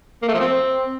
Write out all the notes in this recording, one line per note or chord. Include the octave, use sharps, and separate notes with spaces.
A#3
A3
F3
C4